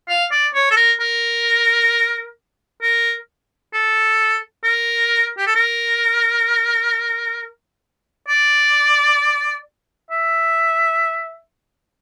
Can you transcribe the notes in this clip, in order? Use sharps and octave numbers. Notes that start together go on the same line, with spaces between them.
F5
D5
C#5
A4
A#4
A#4
A#4
A4
A#4
G4
A4
A#4
D5
E5